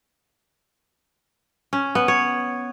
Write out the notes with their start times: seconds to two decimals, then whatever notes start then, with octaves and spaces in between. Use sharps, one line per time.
1.73 C#4
1.95 B3
2.08 C#5